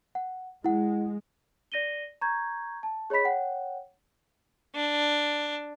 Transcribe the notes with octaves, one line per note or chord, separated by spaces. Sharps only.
F#5
G#3 E4 F#5
D5 A#6 D#7 G7
A#5 C#6 G6 G#6
A5
G#4 C#5 D#5 B5 B6
C#5 F#5 G5
D4